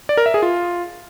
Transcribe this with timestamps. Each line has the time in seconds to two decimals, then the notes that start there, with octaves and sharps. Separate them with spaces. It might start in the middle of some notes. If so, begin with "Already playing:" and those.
0.09 D5
0.17 A#4
0.26 E5
0.34 G#4
0.42 F4